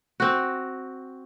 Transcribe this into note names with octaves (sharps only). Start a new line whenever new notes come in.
C4 F#4